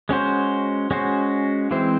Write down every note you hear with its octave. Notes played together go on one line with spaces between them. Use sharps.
G#3 C#4 F#4 C5
G#3 C#4 F#4 C5
E3 G#3 C4 E4 C5